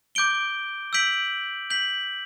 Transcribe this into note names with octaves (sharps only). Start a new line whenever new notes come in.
D6 G6 D7 G7
E6 G6 B6 D7 F#7
G6 B6 F#7